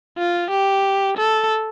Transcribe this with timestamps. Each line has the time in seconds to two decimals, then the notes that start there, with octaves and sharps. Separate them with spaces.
0.18 F4
0.51 G4
1.17 A4